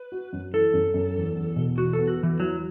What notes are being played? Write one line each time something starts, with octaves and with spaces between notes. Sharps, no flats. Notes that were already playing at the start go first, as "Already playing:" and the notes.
Already playing: B4
F#4
F#2
E3 A4
F#2
F#2
E2
E2
B2
E2 F#4
A4
B3
F#4
E2 E3
F#3 E4